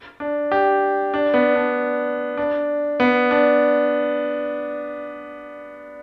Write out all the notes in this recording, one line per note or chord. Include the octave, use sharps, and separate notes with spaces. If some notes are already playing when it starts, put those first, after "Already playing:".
D4
G4
D4
B3
D4
D4
B3
D4